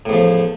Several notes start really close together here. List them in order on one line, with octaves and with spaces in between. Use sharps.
A2 E2 F3